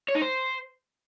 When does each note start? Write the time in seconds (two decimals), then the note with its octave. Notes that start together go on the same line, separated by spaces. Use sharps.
0.08 C#5
0.15 D#4
0.21 C5